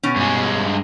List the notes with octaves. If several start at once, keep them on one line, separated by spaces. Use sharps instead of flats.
B2 C#4
G2 G#3